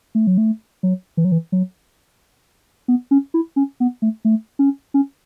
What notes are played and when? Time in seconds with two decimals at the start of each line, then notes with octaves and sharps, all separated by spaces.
0.15 A3
0.27 F#3
0.38 A3
0.83 F#3
1.17 E3
1.25 F#3
1.32 E3
1.52 F#3
2.88 B3
3.11 C#4
3.34 E4
3.56 C#4
3.80 B3
4.02 A3
4.25 A3
4.59 C#4
4.94 C#4